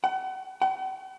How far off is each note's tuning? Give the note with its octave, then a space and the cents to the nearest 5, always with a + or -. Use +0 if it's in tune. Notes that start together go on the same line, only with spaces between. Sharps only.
F#5 +35
F#5 +45